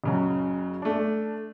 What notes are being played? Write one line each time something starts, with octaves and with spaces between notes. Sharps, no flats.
F#1 C#3 F#3
A3 D4